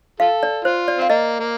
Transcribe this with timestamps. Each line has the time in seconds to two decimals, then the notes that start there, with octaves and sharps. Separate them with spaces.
0.20 F4 A4 F5
0.43 D5
0.65 F4 C5
0.88 D5
0.98 C4 F5
1.09 A#3 D#5
1.40 A#3